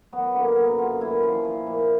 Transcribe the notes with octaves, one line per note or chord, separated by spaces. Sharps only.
F#3 B3
D3 A#3
F#2 B3
F#2 F4
A#2 E4
F3
F3
A#2